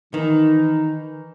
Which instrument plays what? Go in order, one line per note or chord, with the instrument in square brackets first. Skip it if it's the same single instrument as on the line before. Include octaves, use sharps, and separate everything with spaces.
[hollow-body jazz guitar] D#3 [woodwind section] E3 D#4